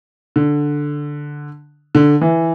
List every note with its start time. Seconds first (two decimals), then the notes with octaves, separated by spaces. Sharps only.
0.36 D3
1.95 D3
2.21 E3